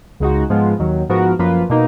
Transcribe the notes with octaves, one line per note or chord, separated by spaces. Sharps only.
C#2 C#3 G#3 D#4 F#4
G#2 F3 G#3 B3 F4
D#2 D#3 F#3
G#2 F3 B3 F#4 A#4
F#2 F3 A#3 F4 B4
B2 A#3 D#4